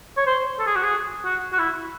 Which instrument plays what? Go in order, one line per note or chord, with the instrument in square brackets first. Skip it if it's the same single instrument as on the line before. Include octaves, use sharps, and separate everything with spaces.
[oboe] C#5
C5
A4
G#4
F#4
G#4
F#4
F#4
E4